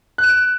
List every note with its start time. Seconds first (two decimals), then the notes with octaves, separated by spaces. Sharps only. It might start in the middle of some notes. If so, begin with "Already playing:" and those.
0.18 F#6
0.24 E7
0.29 D7